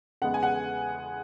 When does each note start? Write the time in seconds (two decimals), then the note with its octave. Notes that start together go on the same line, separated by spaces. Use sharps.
0.22 E2 C#3 G#3 B3 F#5
0.34 G#5
0.43 F#5